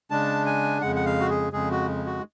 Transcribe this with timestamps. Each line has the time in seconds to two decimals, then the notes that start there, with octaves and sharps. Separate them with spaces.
0.11 C#3 G#3 D4 A5
0.46 G#5
0.81 F2 C#3 G#3 F#5
0.96 F#5
1.05 F5
1.21 F#4
1.29 G#4
1.53 F2 C#3 G#3 G#4
1.71 F#4
2.06 F#4